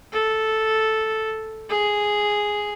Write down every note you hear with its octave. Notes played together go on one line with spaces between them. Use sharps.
A4
G#4